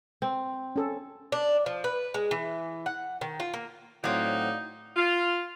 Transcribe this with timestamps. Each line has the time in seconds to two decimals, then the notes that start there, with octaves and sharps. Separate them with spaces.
0.22 C4
0.76 C#4 A4
1.32 D4
1.66 F3
1.84 B4
2.14 G#3
2.31 E3
2.86 F#5
3.21 D#3
3.40 F4
3.54 A#3
4.04 A2 F#3 C4 D#4 D5 F5 F#5
4.96 F4